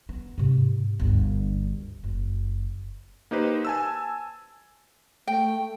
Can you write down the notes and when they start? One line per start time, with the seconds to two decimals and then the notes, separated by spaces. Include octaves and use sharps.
0.09 B3
0.38 G#2 C3
1.00 G1 D2
2.04 F#1
3.31 A#3 D#4 G4 B4 C5
3.65 G#5 A5 E6
5.27 A3 G5